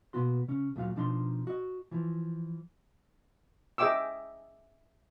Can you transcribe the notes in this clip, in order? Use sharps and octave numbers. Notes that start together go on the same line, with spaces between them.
B2 A#3 B3 F#4 C6
C#3 C#4
D2 A#2 F#3 F5
B2 F3 D4 D#4 A#5 C6
F#4 D#5
E3 F3
G#4 D#5 E5 G5 D6 E6